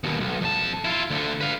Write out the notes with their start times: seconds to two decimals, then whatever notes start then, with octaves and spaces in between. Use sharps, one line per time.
0.04 D#2 B2
0.20 B1
0.41 F2 A5
0.85 E4 F4
1.10 D2 D3
1.41 B4 F5